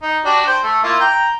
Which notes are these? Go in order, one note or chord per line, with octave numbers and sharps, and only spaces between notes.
D#4
D4 F#4 G4
C5 G5
A3
A#3 E4 F4
G5 A#5